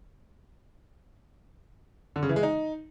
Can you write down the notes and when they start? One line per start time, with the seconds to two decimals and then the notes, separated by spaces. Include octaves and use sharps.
2.16 D3
2.23 C#3
2.29 E3
2.36 G#3
2.43 D#4